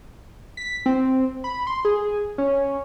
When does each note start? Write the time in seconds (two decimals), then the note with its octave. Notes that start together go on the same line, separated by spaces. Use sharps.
0.57 B6
0.86 C4
1.44 B5
1.67 C6
1.85 G#4
2.38 C#4